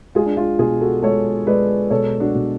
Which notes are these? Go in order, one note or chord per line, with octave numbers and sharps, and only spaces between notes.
G#3 F4 G#4
D4
F4
B2 F4 G#4
F#4 A4
G#3 A4 C#5
G#3 B4 D5
B2 A4 C#5
D4 F#4
B2